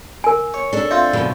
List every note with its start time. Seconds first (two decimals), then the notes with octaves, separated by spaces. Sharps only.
0.24 A#4 G#5
0.54 C#5
0.73 D4 A4
0.91 C4 F4 E5
1.13 F#2 B2 D3